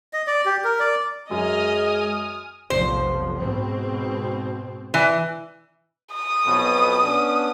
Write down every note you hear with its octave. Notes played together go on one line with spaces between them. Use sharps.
D#5
D5
G4
A#4
D5
F#2 G#3 D#5 G#5 D#6 F6
F1 B1 F3 C5
G#2 B2 C4
E3
D#6
B1 F2 B2
B3 C#4 D4